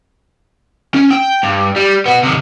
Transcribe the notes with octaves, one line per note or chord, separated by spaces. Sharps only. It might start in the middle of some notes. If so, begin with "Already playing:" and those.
C#4
G5
G2
G3
B3 F#4
C3 D#3